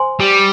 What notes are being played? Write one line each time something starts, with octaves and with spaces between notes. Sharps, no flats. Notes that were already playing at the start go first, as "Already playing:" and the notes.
Already playing: C5 G#5 C6
G3